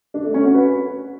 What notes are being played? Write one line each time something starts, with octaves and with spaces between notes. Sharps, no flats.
D4
A3
C#4
F#4
B4